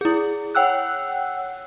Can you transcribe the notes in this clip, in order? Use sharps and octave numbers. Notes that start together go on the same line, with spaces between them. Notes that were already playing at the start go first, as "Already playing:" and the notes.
E4 G#4
C#5 F#5 G5 E6 F#6